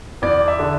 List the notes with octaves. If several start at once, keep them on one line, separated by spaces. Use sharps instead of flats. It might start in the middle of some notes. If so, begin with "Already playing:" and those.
E2 D5
E5
D3